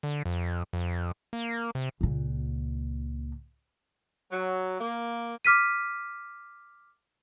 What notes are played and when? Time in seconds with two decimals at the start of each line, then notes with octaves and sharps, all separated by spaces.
0.03 D3
0.25 F2
0.73 F2
1.33 A#3
1.75 C3
2.01 C#2 A#2
4.32 F#3
4.80 A#3
5.45 D6 F6 B6 D#7